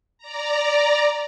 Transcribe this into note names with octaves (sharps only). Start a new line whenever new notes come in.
D5 A#5